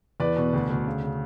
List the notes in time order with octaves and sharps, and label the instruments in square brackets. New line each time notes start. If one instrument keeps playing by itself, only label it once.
[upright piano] E2 B4 D5
B2
D2
D2
C#3
C#3